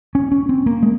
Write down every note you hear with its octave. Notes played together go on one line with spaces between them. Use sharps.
C#4
C#4
C4
A#3
G#3